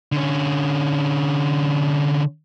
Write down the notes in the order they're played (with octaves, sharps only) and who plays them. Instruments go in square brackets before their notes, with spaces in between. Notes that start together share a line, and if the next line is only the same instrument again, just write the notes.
[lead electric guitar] D3 C#4